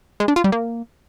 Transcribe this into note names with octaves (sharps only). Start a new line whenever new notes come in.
G#3
D4
F4
G3
A#3